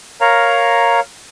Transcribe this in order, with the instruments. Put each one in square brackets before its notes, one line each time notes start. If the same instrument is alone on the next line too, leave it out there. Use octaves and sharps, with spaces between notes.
[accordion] A#4 C#5 F5 A#5